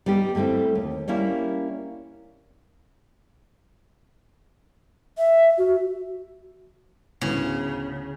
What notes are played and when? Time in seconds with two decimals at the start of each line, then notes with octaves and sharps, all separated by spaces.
0.06 G3 B3 D#4 G4
0.35 D3 G3 A3 C4 E4
0.75 D#2
1.08 G3 A#3 C#4 E4 A#4
5.18 E5
5.58 F#4
7.21 D2 A2 C#3 B3